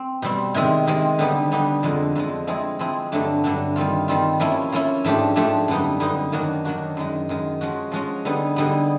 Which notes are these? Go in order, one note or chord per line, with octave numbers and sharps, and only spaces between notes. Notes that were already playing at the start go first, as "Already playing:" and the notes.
Already playing: C4
B2 G3 C4
C3 D#3 G#3 C4
C3 D#3 G#3 C4
D3 G3 B3 D#4 G4
D3 G3 B3 D#4 G4
F2 D3 F3 G#3
F2 D3 F3 G#3
F3 G#3 C4 E4 G#4
F3 G#3 C4 E4 G#4
G2 D3 F#3 A3 D4
G2 D3 F#3 A3 D4
D#3 G3 C4 F4
D#3 G3 C4 F4
F3 A#3 C#4 E4
F3 A#3 C#4 E4
G#2 F3 A3 D4 G4
G#2 F3 A3 D4 G4
F#2 D3 G3 B3 D#4
F#2 D3 G3 B3 D#4
D#3 F#3 A#3 D4 F#4
D#3 F#3 A#3 D4 F#4
F#2 D#3 G#3
F#2 D#3 G#3
F3 G#3 C#4 F#4
F3 G#3 C#4 F#4
D3 G3 B3 D#4 G#4
D3 G3 B3 D#4 G#4